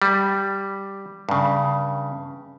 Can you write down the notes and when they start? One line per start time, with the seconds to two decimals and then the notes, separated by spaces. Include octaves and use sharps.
0.02 G3
1.29 G2 C#3